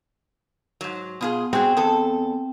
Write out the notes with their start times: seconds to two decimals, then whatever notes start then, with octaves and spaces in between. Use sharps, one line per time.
0.81 G#2 F#3
1.21 B2 B3 F4 G#4
1.53 C4 F#4 G#4
1.77 E2 A4